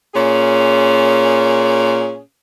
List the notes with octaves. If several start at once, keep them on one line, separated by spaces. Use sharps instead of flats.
A#2 C#4 G#4